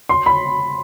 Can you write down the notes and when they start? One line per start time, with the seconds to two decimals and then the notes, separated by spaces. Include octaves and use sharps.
0.09 C6
0.26 B5